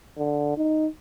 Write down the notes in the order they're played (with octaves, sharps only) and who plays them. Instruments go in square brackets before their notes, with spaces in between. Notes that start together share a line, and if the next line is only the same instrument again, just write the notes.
[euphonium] D3
D#4